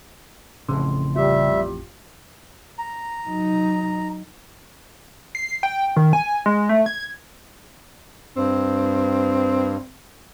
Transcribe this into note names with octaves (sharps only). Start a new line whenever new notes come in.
A1 F2 A2 C#3 C6
G3 F4 G4 E5
A#5
F#3 D#4
C7
G5
D#3
G#5
G#3
A3
G#6
G2 C4